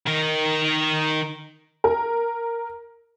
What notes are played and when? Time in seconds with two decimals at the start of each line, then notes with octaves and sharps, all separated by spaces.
0.06 D#3 A#4
1.84 A#4